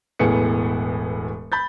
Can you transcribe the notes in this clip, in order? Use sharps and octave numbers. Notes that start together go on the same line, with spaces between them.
E1 A2 B3 G#4 C#7
B5 G6 A6